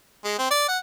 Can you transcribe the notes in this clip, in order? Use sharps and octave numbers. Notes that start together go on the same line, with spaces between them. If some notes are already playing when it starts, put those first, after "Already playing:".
G#3
C4
D5
F#5